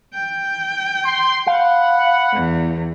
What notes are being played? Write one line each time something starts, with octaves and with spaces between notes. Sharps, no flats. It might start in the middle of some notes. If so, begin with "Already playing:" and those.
G5
C6
F5 F#5 B5
E2